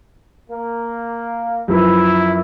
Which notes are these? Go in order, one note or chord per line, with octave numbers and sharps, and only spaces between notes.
A#3
F#2 F3 E4 B4